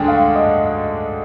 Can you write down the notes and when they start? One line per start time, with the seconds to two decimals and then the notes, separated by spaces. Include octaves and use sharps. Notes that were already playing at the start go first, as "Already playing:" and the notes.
Already playing: D2 D3 G#3 D4 G5 G#5
0.08 F5
0.36 D#5